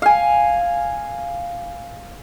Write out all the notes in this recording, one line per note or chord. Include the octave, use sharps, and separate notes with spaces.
F5 G#5